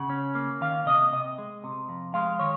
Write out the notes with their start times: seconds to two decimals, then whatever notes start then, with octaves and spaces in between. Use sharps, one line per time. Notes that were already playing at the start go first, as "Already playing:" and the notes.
Already playing: C#3 F#5
0.10 C#4
0.35 A#3
0.61 D#3 F5
0.86 C3 D#5
1.13 C3 D#5
1.38 G#3
1.64 C3
1.89 F2
2.14 G#3 F5
2.39 D#3 C#5